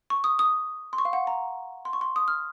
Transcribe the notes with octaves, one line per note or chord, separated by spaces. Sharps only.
C#6
D#6
D#6
C6
C#6
F5
F#5
A#5
C6
C#6
C6
D#6
F6